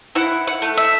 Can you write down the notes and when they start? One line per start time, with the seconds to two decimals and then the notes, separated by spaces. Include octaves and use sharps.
0.15 E4 F#5
0.47 F#5
0.62 A3
0.77 E5